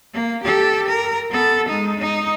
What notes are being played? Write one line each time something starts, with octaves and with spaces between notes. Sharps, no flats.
A#3
G4 A4
A#4
B3 A4
G#3 D#4
D#4